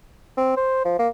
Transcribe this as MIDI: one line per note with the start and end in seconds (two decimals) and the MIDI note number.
0.37 0.56 60
0.57 0.82 72
0.85 0.96 53
0.99 1.08 58